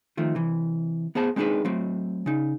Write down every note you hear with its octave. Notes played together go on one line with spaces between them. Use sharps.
D#3 F3 A3
C3 E3
B3 G#4 C5 A5
G#3 C4 D4 D#4 G#4 B4
F#3 A3 C4
C#3 D#4